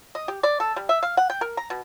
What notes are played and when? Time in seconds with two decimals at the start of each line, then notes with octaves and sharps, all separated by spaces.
0.15 D#5
0.28 G4
0.43 D5
0.60 A4
0.76 G3
0.89 E5
1.03 F5
1.17 F#5
1.30 G5
1.41 A#4
1.57 A#5
1.70 B2